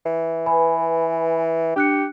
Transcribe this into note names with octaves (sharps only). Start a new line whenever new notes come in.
E3
B4 G#5 B5
D4 G4 F#6 C#7